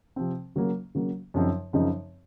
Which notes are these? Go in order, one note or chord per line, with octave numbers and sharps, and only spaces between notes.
C3 F3 C4
C#3 F#3 A#3
C#3 F#3 A#3
F#2 C#3 F3 C4 D#4
F#2 C#3 F3 C4 D#4